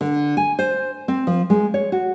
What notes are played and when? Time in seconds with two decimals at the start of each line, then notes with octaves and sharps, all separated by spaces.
0.01 D3
0.37 G#5
0.59 C5
1.08 C4
1.27 F3
1.50 G#3
1.74 C#5
1.92 F#4